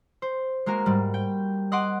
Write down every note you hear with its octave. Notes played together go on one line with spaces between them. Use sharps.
C5
G#3 A#3 F#4 A#4
G#2 G3
G5
D#5 F#5 C6 D6 D7